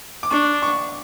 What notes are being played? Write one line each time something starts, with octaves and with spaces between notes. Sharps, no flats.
D6
D4 C#6
C#6